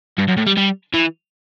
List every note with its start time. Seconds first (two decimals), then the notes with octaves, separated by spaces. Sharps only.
0.18 G2
0.28 F#2
0.37 A2
0.46 G3
0.57 G3
0.94 E3